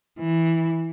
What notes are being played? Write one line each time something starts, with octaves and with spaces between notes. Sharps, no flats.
E3